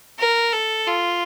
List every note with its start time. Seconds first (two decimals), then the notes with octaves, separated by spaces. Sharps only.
0.19 A#4
0.53 A4
0.87 F4